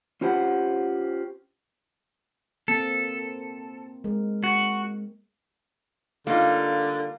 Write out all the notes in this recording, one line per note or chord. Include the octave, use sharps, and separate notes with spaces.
C#4 F4 G4 C5 F5 F#5
A#3 C4 A4
G#3 A#4
F#4
D3 G3 A#3 D#4 F4